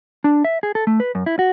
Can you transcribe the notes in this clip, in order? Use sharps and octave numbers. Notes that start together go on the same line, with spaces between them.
D4
E5
G#4
A4
A3
B4
F#2
E4
F#4